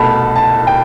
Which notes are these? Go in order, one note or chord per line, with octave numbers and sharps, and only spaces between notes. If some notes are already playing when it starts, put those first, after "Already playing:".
Already playing: C2 B2 A3 A5 B5
A5
G5